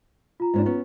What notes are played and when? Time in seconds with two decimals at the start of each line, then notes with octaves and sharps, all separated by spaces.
0.40 F4 A#5
0.54 G#2 C#4 D4
0.66 B3 C#4